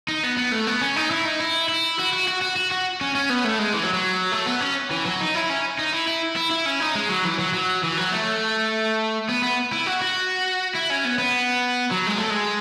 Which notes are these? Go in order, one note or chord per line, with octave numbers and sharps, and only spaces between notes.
D#4
B3
B3
A3
B3
C#4
D#4
E4
D#4
E4
E4
F#4
F#4
F#4
F#4
F#4
F#4
C#4
C#4
B3
A3
G#3
E3
F#3
F#3
A3
B3
C#4
E3
F#3
D#4
E4
C#4
D#4
E4
E4
E4
E4
C#4
D#4
G#3
F#3
E3
F#3
F#3
E3
F#3
A3
B3
B3
E4
F#4
F#4
E4
C#4
B3
B3
F#3
G#3
A3
G#3